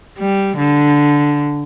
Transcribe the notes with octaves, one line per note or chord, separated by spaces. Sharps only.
G3
D3